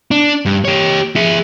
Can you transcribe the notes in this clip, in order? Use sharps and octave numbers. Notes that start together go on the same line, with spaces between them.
D4
G2
G4 C#5
G#4 E5